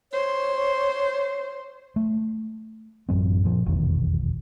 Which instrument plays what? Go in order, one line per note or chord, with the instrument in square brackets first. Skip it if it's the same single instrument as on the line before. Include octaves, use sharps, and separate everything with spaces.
[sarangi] C5 [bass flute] C#5
[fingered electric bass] A3
A1 F#2 F#3 C4
A#2 F3
F1 B1 E2 D#3